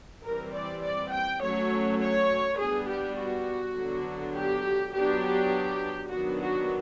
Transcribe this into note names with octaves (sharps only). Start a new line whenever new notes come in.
E3 G3 C4 A#4
D5
D5
G5
F#3 A3 C#4 C#5
C#5
G3 B3 D4 G#4
G4
F#4
D3 F#3 B3 D4
G4
F#3 B3 D4 G4
D#3 F#3 B3 D4 F#4
F#4